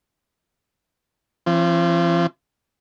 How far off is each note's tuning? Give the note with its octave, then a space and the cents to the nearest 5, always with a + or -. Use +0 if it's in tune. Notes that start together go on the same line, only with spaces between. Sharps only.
F3 -40 C4 +25